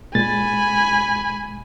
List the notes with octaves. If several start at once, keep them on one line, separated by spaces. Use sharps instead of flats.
A#2 G#3 G#5 B5 A6